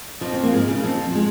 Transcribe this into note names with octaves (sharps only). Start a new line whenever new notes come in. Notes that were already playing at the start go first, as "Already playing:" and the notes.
F2 F3
C4
A#3
G#2 G#3
C#3
F2 F3
G#3